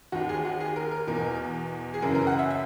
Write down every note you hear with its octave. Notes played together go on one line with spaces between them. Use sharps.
D#2 D#3 F#4
G#4
F#4
G#4
A#4
A#4
E2 B2 A#4
G#4
F#2 C#3 E3 A#4
A#4
F#5
E5
E5